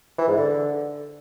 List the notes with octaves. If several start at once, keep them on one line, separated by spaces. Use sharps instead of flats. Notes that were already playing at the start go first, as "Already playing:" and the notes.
E3
G#2
D3